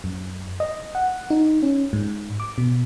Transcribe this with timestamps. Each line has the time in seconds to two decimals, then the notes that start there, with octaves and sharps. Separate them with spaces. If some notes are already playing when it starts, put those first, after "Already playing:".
0.04 F#2
0.60 D#5
0.95 F#5
1.30 D#4
1.62 C#4
1.93 G#2
2.40 D6
2.58 B2